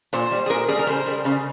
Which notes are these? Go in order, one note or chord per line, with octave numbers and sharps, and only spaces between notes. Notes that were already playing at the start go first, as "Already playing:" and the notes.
A#2 C5
G3
G#4
A#2 A#4
G3 G#4
A#4
C#3 C5
G3
C#3